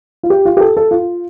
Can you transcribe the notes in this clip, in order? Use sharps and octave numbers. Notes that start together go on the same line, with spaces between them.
F4
G4
F4
G4
A4
A4
F4